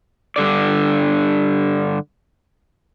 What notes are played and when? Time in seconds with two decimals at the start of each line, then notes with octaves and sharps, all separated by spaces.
0.36 G2 D3 D5